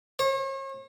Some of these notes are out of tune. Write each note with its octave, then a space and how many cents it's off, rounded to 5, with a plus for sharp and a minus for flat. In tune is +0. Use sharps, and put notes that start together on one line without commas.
C#5 -40